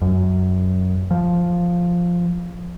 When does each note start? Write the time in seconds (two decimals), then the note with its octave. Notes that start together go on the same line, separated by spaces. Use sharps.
0.02 F#2
1.11 F3